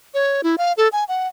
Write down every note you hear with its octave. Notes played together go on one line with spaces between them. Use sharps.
C#5
E4
F5
A4
G#5
F#5